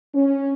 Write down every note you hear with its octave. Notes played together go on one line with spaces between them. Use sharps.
C#4